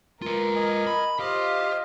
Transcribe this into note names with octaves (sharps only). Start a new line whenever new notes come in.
F4 A#4 B4
D#5 G#5
B5
F4 G4 C5 D#5 F5